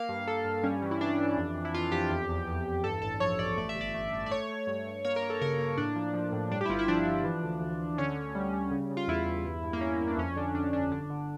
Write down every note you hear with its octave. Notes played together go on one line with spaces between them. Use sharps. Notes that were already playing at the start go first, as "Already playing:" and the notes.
Already playing: A#3 F5
G2
G2 A4
G2
G3 C#4
E3
E4
E3 D4
E3
F2
F2
E4
F2 F4
F2 G4
E2
E2
E2
E2
G2 A4
A1 A4
F3 C#5
A1 D5
A3 D5
E5
G1
D5
A3
A3
D5
A3 C#5
A3
G2
G2
A#3 C#5
A#4
A#3
A4
C#3 A#4
A#3
A2 D4
F3
F3
A2
G2 D4
G4
E4
G1 F4
E4
F3 D4
F3
E3
D2
D2
D2
D3 C#4
D3
G3
G3
C#3
C#3
F4
E2 E4
E2
G2
G2
A#3
G2 C#4
G2
D4
F2 C#4
D3 D4
F2 D4
G1 D4
D3 D4
D3